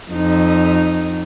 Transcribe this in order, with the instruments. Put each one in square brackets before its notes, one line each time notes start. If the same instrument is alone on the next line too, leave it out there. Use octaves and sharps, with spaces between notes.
[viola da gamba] F2 D#4